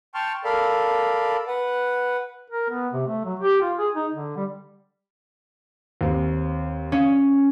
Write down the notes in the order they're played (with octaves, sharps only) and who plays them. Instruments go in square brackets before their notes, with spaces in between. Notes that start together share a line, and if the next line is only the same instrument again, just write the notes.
[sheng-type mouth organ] G5 A5 C6 C#6 F6
A4 A#4 D5 F5 B5
B4 F#5
[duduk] A#4
B3
C3
A3
F#3
G4
F4
G#4
D#4
D3
G3
[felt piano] D#2 C4
[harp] C#4 [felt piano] F5